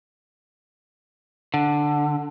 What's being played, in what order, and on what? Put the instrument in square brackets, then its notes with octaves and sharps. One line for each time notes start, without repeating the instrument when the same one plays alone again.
[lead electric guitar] D3